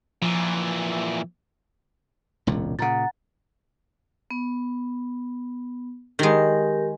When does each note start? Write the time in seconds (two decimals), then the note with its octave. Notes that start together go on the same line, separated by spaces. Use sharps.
0.22 A#2 E3 F3
2.47 E1 C#2 A#2
2.79 A#2 C#3 F#5 A#5 A6
4.30 B3
6.19 D#3 G#3 G4 A#4